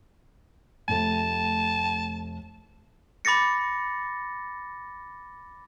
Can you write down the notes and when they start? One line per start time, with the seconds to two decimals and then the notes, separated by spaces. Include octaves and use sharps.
0.88 F1 A3 A5
3.25 B5 D6 A6 A#6 C#7